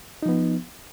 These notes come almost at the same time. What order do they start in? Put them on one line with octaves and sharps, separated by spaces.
D#4 F3 B3